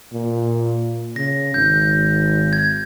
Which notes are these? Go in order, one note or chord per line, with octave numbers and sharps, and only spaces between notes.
A#2
C#3 A#6
G#1 G6
G#6